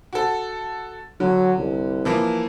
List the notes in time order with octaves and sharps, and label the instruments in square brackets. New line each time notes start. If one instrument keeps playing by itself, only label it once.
[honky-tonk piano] F#4 A4
[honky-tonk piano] D3 [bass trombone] F#3
[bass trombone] C2
[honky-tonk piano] E3 F3 A#3